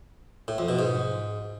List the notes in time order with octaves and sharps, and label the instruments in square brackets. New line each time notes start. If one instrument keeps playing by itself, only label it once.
[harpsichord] A2
F2
B2
G#2